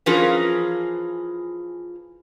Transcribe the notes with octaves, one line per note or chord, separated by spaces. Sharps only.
E3 F3 C#4 F4 G#4 A#4